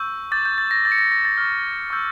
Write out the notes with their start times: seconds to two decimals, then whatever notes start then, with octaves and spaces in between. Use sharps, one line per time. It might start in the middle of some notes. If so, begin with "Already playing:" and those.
Already playing: C#6 E6 G6
0.31 D6 G6 A6
0.45 G6
0.58 A6
0.71 A#6
0.85 D6 G6 A6
0.92 C#7
0.98 A#6
1.12 A#6
1.25 A6
1.38 C#6 F6
1.90 C#6 E6 G6